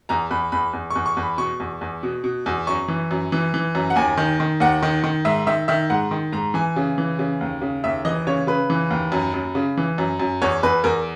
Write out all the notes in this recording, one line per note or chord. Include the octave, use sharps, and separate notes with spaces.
E2 A#5
E2 B5
E2 B5
E2
C#6
E2
C#6
E2
B5
B2 C#6
E2
E2
B2
B2
E2
F#2 C#6
E3
F#2
E3
E3
F#2
F#5
D#2 G#5
D#3
D#3
D#2 F#5
D#3
D#3
G#2 E5
D#3 E5
D#3 E5
G#2 F#5
D#3
G#2 A#5
E3 G#5
C#3
E3
C#3
D#2
C#3
D#2 E5
E3 D#5
C#3 C#5
C#3 B4
E3
D#2
F#2
F#2
C#3
E3
F#2
F#2
E2 C#5
E2 B4
E2 A#4